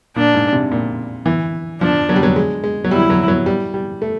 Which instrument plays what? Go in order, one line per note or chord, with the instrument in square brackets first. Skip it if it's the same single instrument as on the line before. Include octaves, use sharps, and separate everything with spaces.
[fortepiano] A#2 [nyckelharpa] D4
[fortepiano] G#2
C3
A#2
E3
[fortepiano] F3 [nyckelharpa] D4
[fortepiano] F#3
G3
F#3
G#3
G#3
F#3
[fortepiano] G3 [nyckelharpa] E4
[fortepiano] F#3
F#3
G3
G3
A3